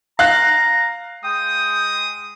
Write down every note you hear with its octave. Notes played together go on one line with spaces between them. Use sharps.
F5 A#5 F#6
G#3 G5 D#6